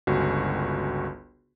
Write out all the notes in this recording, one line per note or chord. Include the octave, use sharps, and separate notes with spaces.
G1 C#2 F#4